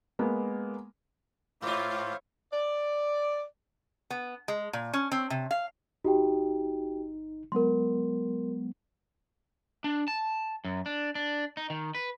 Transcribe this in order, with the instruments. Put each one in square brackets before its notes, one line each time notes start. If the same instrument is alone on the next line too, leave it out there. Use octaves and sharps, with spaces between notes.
[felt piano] G#3 A#3 B3
[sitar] G#2 F4 [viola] E4 C#5 [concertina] C5 F5 [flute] D6
[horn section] D5
[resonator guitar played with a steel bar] B3
G#3
A#2
C#4
C4
C3
F5
[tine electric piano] G1 D#4 [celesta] F#4 G4 G5
[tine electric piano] F#3 G#3 B3 [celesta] A#4 C6
[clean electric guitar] D4
A5
F#2
D4
D4
D#4
D#3
B4